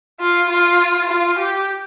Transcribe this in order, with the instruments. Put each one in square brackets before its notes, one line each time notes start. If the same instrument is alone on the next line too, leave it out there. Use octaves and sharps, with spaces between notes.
[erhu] F4
F4
F4
G4